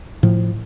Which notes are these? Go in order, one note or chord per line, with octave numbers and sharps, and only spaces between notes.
A2 F3